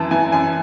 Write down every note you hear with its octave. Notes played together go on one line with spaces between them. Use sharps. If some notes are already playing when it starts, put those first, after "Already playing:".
Already playing: F#2 E3 A5
E3 G#5
F#2 G#5